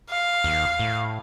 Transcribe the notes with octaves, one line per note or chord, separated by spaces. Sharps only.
F5
D#2
A2